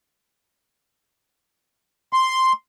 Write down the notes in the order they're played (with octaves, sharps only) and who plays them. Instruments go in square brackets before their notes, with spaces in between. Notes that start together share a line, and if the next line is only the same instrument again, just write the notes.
[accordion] C6